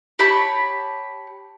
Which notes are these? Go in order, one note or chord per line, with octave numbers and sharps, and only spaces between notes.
G4 C#5 A5 B5